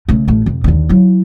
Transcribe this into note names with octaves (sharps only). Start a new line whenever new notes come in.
C#3 A3
A1 A3
F2 C3
D#2 D3
F#3 E4